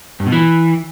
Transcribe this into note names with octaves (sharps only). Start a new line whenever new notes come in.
G2
B2
E3